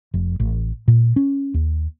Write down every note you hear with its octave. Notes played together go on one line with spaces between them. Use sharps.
F1
A1
A#2
C#4
D#2